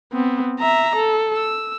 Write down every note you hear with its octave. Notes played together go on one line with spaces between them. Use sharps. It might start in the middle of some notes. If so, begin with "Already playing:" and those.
B3 C4
E5 A#5
A4
E6